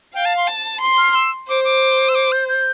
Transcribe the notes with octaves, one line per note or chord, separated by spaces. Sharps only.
F5 G5
A5
C6
A5
C6
F6
E6
C5 D6
D6
E6
D6
G6
G6